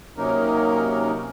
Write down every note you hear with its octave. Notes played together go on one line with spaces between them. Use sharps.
C3 F#3 A#3 C#4 D#4 A#4